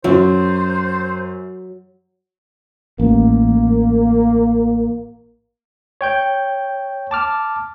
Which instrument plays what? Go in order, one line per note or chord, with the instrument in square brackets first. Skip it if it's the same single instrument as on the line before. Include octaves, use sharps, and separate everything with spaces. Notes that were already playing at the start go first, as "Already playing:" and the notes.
[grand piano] F#2 [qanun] F#3 [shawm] C5
[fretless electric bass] A1 [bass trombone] A#3
[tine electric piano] C#5 G5 G6
A5 D6 F6